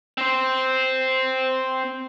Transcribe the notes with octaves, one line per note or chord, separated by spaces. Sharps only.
C4 C5